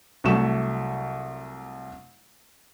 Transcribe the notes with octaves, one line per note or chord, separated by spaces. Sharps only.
C2 F#3 A3 C#6 E7